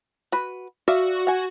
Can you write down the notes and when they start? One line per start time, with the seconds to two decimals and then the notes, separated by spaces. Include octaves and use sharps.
0.32 F#4 B4
0.88 F#4 D5 E5 F5
1.27 F#5 G#5